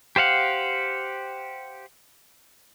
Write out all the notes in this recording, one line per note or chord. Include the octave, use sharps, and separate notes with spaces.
G4 C5 F5 F#5